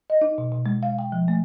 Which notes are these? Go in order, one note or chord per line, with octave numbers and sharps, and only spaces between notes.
D#5
D#4
B2
B2
G#3
F5
G5
F3
A3